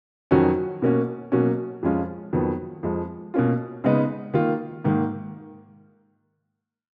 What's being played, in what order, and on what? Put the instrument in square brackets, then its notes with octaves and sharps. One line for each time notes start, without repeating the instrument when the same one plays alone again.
[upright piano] F2 D#3 F#3 C#4 F#4
B2 A#3 C#4 F#4
B2 F#3 A#3 C#4 F#4
F2 F3 G#3 C#4 F4
F2 D#3 F#3 B3
F2 F3 G#3
B2 A#3 C#4 F4
C#3 G#3 B3 D#4
D#3 A#3 F4
G#2 D#3 A#3